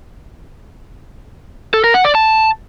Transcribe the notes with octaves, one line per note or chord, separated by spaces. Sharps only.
A4
A#4
F#5
D5
A5